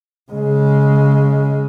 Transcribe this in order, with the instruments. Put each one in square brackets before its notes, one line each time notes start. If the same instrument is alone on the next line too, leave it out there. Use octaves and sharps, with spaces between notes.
[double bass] C#3 G#3